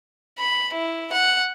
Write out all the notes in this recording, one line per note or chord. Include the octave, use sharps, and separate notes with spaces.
B5
E4
F#5